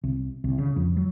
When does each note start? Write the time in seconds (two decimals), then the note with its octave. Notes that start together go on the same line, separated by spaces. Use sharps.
0.03 C2
0.44 C2
0.58 C#3
0.76 F2
0.97 F#3